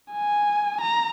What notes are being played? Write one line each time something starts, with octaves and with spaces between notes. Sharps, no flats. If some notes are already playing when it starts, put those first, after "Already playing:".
G#5
A#5